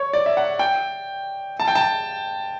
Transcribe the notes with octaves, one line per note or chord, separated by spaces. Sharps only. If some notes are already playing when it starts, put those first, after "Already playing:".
Already playing: C#5
D5
E5
F#5
G5
A5
G5
A5